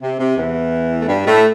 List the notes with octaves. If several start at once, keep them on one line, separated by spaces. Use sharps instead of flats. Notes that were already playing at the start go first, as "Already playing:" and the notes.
C3
C3
E2 E3
A3
G2 G3
A2 A3